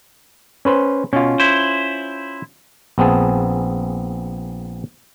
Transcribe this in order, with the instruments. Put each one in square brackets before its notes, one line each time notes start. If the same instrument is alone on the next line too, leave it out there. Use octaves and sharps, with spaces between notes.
[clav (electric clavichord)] C#4 B4 C5
[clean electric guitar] B2 [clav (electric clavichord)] C#4 F4
[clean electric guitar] E4 C5
[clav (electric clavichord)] A#1 B3 C4 G#4 A5